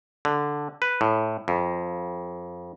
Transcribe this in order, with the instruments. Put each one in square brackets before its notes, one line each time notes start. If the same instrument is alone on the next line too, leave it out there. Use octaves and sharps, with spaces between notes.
[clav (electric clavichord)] D3
B4
A2
F2